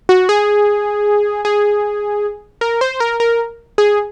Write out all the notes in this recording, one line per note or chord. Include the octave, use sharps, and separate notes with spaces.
F#4
G#4
G#4
A#4
C5
A#4
A#4
G#4